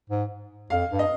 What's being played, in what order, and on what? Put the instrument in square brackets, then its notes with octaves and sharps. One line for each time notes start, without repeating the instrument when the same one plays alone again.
[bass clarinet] G#2
[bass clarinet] F2 [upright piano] F5
[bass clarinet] G2
[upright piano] D#5